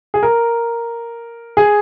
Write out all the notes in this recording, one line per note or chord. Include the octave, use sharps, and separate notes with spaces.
G#4
A#4
G#4